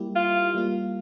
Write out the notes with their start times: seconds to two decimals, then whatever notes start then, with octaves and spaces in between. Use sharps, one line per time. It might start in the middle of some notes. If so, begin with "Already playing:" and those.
Already playing: G3 A#3 E4 G4
0.15 F4
0.55 G3 A#3 F4